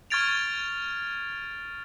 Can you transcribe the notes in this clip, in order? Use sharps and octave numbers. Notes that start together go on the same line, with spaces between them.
C#6 F6 G#6 A6 D7 F7